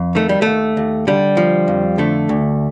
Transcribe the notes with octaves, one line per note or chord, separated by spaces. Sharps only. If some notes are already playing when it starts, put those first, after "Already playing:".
Already playing: F2
D#3 A3
G3
D#2 A3
D#2
D3 G3
F3
F2
D3 A3
D2